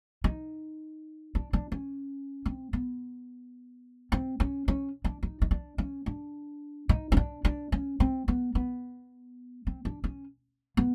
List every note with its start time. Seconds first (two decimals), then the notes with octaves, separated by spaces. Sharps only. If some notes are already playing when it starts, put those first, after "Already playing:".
0.24 D#4
1.35 D4
1.53 D4
1.72 C#4
2.46 C4
2.73 B3
4.12 C4
4.40 C#4
4.68 C#4
5.04 D4
5.23 D#4
5.42 D#4
5.51 D4
5.78 C#4
6.06 D4
6.89 D#4
7.12 C#4
7.17 D4
7.45 D4
7.72 C#4
8.00 C4
8.28 B3
8.55 B3
9.67 C4
9.85 D4
10.04 C#4
10.77 B3